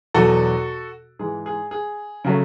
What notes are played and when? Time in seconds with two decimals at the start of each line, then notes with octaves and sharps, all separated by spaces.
0.14 E2 B2 F#3 F#4 A4
1.19 G#2 E3 G#3 G#4
1.46 G#4
1.71 G#4
2.24 C#3 F#3 A3